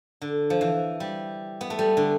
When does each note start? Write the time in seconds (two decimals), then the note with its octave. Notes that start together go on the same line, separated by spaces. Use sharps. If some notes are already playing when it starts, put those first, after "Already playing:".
0.22 D3
0.50 F3
0.61 E3
1.00 G3
1.61 B3
1.70 A3
1.79 G3
1.97 D3